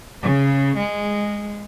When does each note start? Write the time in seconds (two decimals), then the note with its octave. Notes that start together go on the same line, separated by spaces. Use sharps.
0.21 C#3
0.77 G#3